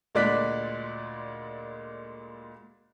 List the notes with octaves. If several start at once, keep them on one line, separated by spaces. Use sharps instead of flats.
D2 A#2 G#3 D5 F#6 B6